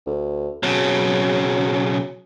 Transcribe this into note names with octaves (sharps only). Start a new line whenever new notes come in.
D2
B1 C#3 F#3